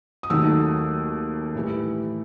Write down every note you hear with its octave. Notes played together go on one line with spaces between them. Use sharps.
D#6
D#2 D#3 F#3 A3 E6
A2 E3 G3